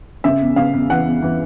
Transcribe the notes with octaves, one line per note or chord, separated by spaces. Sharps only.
C#3 E5
E2
C#3 F5
E2
E3 F#5
E2
E3